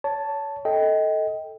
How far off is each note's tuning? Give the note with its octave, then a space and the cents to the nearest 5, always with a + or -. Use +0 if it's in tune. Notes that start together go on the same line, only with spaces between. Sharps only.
C#5 +25 A5 +0
A4 +0 D#5 +20 G5 +5